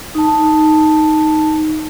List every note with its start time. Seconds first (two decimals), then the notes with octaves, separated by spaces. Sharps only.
0.15 D#4 A5